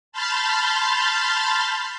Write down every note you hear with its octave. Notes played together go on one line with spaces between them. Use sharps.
A5 B5 C6 F6 G6 A6